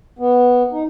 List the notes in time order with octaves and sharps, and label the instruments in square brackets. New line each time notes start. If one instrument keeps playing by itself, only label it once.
[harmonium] B3
D#4